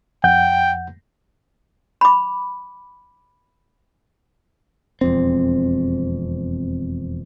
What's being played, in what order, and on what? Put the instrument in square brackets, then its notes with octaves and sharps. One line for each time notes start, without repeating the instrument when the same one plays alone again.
[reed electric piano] F2 F#5 G6 [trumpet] G5
[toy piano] B5 D6
[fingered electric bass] E1 F2 C4